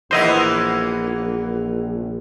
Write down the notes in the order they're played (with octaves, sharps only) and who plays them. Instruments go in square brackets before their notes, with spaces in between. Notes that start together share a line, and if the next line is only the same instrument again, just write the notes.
[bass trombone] A#1 [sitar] E3 A#3 B3 [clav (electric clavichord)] C5 D#5 E5